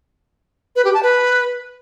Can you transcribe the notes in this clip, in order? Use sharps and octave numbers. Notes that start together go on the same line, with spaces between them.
B4
G4
A5
B4